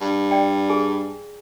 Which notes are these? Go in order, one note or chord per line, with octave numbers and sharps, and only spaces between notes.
G2
D5 G5
G#4 G#5